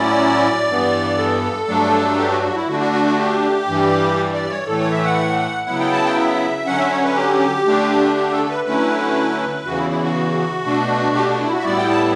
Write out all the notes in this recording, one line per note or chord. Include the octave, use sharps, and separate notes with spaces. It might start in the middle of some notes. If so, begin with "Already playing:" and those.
Already playing: A2 F#3 C#4 E4 D5
G2 E3 B3
A4
G2 F#3 A3 D4
G4
F#4
F#4
E4
D3 A3 D4 F#4
F#4
F#4
F#4
G4
G2 E3 G3
D5
C#5
A2 E3 A3 A4
C#5
E5
F#5
C#3 F#3 B3 E4 F#5
G5
A5
G5
E5
D3 F#3 C#4 F#5
E5
C#5
B4
G4
D3 A3 D4
G4
A4
B4
D3 F#3 A3 C#4 E4 B4
E2 C#3 E3 F#4
E4
E4
F#4
B2 A3 D4
G4
F#4
E4
F#4
E5
A2 G3 B3 E4 D5
G5
A5